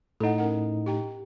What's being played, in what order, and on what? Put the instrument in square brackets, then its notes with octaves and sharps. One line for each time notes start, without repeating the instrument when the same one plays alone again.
[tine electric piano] A2 D#4 [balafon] A4 F#5
[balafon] C#4 A#4 F#5
G4 G5 A#5